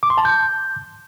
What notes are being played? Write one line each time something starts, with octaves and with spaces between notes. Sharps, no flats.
D6
C6
A5
G6